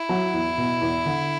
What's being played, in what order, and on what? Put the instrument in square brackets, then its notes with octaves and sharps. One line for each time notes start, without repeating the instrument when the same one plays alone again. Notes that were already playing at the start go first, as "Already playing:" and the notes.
Already playing: [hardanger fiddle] E4
[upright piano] F#3
E2
B2
E2
D3